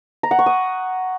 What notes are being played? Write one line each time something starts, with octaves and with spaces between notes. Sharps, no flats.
A#5
F#5
C#6
D#6